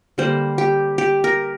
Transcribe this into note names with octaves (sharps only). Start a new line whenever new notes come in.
D3 G3 A#3 C5
G4
G4
A#4